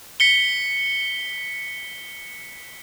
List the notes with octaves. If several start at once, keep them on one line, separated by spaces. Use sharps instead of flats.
B6 C#7 G7